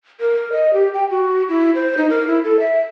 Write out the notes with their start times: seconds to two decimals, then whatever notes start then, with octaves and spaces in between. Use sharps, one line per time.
0.20 A#4
0.52 D#5
0.73 G4
0.94 G5
1.10 F#4
1.49 E4
1.75 C5
1.97 D#4
2.10 A#4
2.27 E4
2.44 A4
2.60 E5